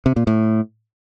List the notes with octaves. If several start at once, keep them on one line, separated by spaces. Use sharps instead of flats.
C3
A#2
A2